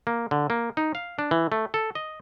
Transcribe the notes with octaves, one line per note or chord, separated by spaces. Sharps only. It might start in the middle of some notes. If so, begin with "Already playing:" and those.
A#3
D3
A#3
D#4
F5
D4
E3
A3
A4
D#5